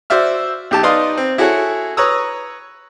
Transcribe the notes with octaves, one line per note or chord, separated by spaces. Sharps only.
F#4 C5 D5 E5 F6
B1 G4 A5
D#4 B4 D5 F5 C6 D#6
C4
E4 F#4 G#4 A4 C#5 F#5
B4 C#5 A#5 C#6 D#6 E6